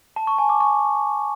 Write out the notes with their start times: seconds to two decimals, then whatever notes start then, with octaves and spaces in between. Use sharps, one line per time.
0.16 A5
0.27 C#6
0.38 G#5
0.49 D6
0.60 C#6